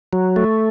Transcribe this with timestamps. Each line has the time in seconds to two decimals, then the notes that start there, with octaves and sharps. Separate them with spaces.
0.13 F#3
0.36 A3